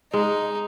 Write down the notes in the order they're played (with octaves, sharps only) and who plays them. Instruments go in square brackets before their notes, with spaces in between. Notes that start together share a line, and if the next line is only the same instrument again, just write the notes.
[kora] G#3 [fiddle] D#4